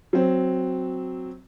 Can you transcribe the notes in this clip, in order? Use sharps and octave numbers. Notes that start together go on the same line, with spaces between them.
F#3 C4